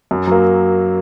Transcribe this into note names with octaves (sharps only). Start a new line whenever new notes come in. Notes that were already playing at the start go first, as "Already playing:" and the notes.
F#2
F#3 A#3